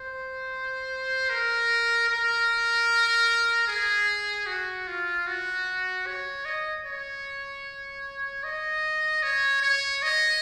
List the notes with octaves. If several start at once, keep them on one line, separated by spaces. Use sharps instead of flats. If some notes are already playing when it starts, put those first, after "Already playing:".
Already playing: C5
A#4
A#4
G#4
F#4
F4
F#4
C#5
D#5
C#5
D#5
C#5
C#5
D#5